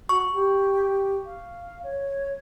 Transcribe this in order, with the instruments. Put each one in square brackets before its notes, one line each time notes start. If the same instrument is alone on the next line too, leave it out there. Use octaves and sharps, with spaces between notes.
[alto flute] F#4 [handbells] C#6
[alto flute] G4
F5
C#5